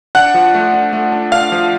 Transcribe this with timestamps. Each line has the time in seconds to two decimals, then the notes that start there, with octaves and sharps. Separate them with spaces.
0.15 D4 F#5 F#6
0.34 F3
0.54 A3
0.73 D4
0.93 A3
1.12 D4
1.32 D4 F5 F6
1.52 F3